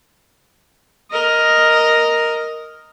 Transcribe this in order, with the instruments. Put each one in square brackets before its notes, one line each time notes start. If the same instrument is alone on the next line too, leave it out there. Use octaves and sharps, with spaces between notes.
[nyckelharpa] A#4 D#5